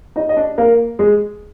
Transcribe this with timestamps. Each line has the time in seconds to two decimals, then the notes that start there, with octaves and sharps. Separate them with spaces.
0.16 D#4 D#5
0.29 D#5
0.37 D4 D5
0.58 A#3 A#4
0.99 G#3 G#4